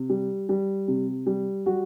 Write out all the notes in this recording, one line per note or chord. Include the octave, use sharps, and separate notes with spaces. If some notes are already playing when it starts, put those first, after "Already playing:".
Already playing: C3
G3
G3
C3
G3
G3 F#4